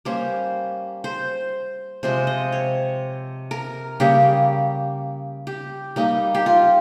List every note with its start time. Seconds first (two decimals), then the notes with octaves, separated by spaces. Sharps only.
0.05 G3 A#3 C#4 C5
1.04 C5
2.03 C3 F3 G#3 C5
2.27 D#5
2.52 C#5
3.51 A#4
4.00 C#3 G3 A#3 G4
5.47 G4
5.96 G3 A#3 D#4
6.35 G4
6.46 F4